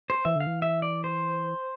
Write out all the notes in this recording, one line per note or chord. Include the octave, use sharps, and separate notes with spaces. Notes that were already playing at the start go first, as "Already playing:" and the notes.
C5
E3 E5
D3 F5
E3
E5
D5
C5